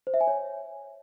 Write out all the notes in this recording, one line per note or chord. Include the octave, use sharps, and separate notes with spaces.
C5
E5
G#5
C#5